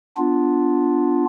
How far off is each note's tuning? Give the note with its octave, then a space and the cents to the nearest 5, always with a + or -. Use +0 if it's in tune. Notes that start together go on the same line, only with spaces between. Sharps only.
B3 +0 D4 +0 F4 +0